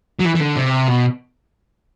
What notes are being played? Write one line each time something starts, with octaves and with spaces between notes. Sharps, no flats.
F#3
E3
E3
D3
C3
B2